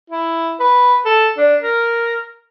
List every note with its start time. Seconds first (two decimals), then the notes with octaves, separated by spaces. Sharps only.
0.10 E4
0.60 B4
1.05 A4
1.38 D4
1.62 A#4